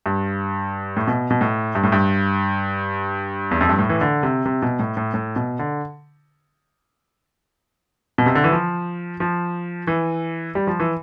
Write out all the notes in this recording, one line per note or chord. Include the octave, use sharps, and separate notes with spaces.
G2
A2
B2
B2
A2
G2
A2
G2
E2
F2
G2
A2
E3
D3
C3
C3
B2
A2
A2
A2
B2
D3
B2
C3
D3
E3
F3
F3
E3
G3
F3
E3